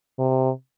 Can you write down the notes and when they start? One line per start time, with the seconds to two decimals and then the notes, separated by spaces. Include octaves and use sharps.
0.19 C3